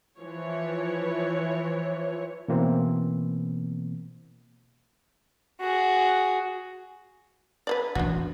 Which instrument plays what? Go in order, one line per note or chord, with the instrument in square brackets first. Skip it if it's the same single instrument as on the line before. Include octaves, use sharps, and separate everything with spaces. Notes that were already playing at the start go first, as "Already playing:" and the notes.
[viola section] E3 F3 C#5
[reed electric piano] B2 E3 A#3 C4
[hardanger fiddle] F#4 G#4
[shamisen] B4 C5 D5
[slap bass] E1 A1 D#2 [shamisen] D4 F#4